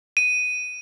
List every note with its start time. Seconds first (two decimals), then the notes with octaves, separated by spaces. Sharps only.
0.17 D#7